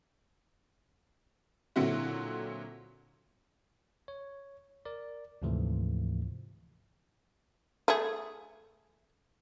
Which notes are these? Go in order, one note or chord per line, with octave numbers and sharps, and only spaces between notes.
A#2 D3 F#3 C4 E4 F#4
C#5
A#4 D5
D2 G#2 C3 E3 F3 A3
A3 G#4